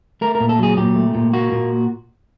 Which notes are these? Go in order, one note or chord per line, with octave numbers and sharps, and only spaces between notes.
A3 A#4
A#4
A#2
A4
F#3 G#4
A#2 G4
A3
A#2
A#3 F#4
A#2